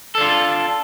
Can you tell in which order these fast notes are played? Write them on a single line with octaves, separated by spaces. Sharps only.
A4 D4 F4